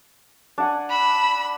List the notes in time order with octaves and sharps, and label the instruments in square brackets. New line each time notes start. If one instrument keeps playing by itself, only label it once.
[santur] D4 F#5 G#5
[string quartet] B5 E6